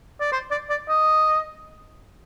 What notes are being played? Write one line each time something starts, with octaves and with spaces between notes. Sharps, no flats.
D5
C5
D5
D5
D#5